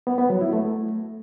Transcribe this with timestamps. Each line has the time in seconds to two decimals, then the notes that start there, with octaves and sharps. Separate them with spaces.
0.07 B3
0.18 B3
0.30 F#3
0.41 E4
0.53 A3